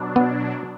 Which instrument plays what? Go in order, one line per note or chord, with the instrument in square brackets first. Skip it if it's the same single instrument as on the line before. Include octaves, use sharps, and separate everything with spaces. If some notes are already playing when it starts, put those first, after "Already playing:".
Already playing: [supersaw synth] B2 F#3 D4
[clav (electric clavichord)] B3